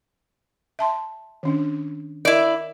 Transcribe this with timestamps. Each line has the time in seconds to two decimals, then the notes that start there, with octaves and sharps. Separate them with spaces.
0.79 E5 A5 C6
1.43 D#3 C#4 D4
2.25 E4 A#4 D5 D#5